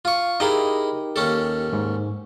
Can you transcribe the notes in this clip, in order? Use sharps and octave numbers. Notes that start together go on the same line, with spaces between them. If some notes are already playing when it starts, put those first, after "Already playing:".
F4 C#6
D#4 E4 G4 G#4 A#4 D#5
D#2 C#4 A4
G#2